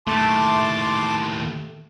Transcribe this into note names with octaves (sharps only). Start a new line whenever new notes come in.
D#2 A2 A3 A5 C6 D6